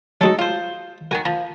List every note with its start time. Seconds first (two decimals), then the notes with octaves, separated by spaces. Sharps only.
0.21 F#3 G#3 D#4 F#4 A4
0.39 F4 C5
1.11 D#3 F#4 A#4 G#5
1.25 F3 A#5